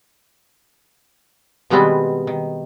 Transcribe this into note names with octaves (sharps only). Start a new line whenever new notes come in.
B2 D#3 G3 G#3 B3 C4
D#3